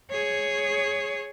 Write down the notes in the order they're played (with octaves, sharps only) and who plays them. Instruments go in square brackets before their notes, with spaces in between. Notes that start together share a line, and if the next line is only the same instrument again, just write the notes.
[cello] G#4 C#5